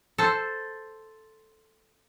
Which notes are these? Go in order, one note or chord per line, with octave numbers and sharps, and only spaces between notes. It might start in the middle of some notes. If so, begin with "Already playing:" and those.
A4 C5